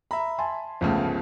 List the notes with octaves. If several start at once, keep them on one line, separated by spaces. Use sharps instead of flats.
E5 A#5 B5
G#5 A5 C6
G1 C#2 C#3 F3 A3